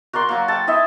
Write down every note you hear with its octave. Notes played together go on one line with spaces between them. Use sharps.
F#4 A#4 D5 C6
F#3 A#3
A4 G5 A5
E4 D#5 E5